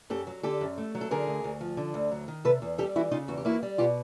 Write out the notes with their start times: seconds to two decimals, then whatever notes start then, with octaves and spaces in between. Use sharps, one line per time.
0.10 F#2 G4 A4
0.27 F#3
0.43 D3 G4 A4
0.61 F#2
0.78 A3
0.95 F#3
1.01 A4
1.11 D3 G#4 A#4
1.27 D2
1.44 D2
1.61 F3
1.77 D3
1.94 D2
2.11 F#3
2.28 D#3
2.44 C3 A4 B4
2.62 E2
2.78 G3 G4 A4
2.96 E3 E4 F#4
3.11 C#3 D#4 F4
3.28 E2 F#4
3.38 G4
3.45 A#3 E4 F#4
3.63 G3
3.78 B2 F4 G4